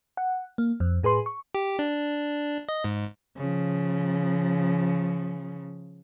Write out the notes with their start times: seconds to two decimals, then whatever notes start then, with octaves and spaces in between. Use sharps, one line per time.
0.17 F#5
0.58 A#3
0.80 F2
1.03 A2 G#4 B4 C6
1.26 C#6
1.55 G4
1.79 D4
2.69 D#5
2.84 G#2
3.37 C#3 F3